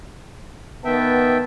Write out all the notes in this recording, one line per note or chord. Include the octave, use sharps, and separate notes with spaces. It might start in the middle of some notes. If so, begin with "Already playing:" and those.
D#3 B3 E5 G5 A5